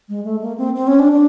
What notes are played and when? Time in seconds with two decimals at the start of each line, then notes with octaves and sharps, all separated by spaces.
0.09 G#3
0.25 A3
0.42 A#3
0.58 C4
0.75 C4
0.87 C#4
0.99 D4
1.12 D4